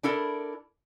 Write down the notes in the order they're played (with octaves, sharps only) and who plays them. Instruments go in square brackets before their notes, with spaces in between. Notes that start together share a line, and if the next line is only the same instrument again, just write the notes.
[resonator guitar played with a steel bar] D4 E4 A4 A#4